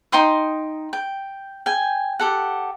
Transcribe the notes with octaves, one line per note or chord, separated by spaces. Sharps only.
D#4 G5 C6 D#6
G5
G5 G#5
G4 A4 F#5